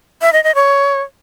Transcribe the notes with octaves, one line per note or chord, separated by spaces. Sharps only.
E5
D#5
D#5
C#5